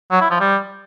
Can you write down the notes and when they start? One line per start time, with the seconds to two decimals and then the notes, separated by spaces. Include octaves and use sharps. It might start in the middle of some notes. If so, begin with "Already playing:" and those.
0.11 F#3
0.21 E4
0.31 F3
0.40 G3